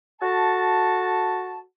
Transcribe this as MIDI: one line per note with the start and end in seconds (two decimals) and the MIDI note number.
0.21 1.59 66
0.21 1.59 69
0.21 1.59 81